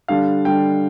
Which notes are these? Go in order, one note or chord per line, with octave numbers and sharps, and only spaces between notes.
D3 G3 D4 F5
D3 G3 D4 G5